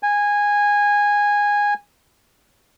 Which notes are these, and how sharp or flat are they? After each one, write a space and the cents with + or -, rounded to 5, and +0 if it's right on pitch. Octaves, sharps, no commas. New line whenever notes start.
G#5 -15